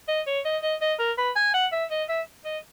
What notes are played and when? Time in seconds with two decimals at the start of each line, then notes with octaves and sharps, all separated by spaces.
0.08 D#5
0.27 C#5
0.44 D#5
0.62 D#5
0.81 D#5
0.99 A#4
1.17 B4
1.35 G#5
1.53 F#5
1.72 E5
1.90 D#5
2.08 E5
2.44 D#5